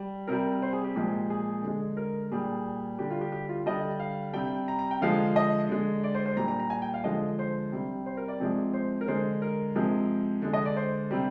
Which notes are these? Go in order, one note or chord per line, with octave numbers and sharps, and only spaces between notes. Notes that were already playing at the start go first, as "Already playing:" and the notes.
Already playing: G3
C3 G3 A#4
C5
G#4
G4
A#2 F3 G#3 G4
G#4
D3 G#3
A#4
A#2 G3 G#4
D3 G3 G4
F4
G4
G4
F4
D3 G3 D#5
F5
C3 G3 G5
A#5
A#5
G5
D3 F3 G#3 F5
D#5
D3 G#3
D5
C5
C5
A#2 G3 A#5
A#5
A#5
G#5
G5
F5
D3 F3 G#3 D#5
C5
C3 G3
C5
A#4
D5
C3 F3 G#3
C5
A#4
D3 G#3 C5
A#4
C3 F3 G#3
D3 G#3
D#5
D5
C5
C3 G3